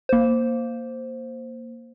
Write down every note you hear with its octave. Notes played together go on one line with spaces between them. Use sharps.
A#3 C5